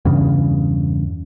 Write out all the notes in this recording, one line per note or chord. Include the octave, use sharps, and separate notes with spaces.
E2 G2 C#3